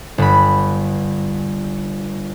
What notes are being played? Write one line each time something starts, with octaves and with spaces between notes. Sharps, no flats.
G1 B5